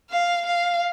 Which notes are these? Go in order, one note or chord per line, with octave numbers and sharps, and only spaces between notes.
F5
F5